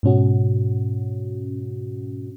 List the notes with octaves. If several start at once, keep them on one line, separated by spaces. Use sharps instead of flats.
G#2 B2 C#4 F#4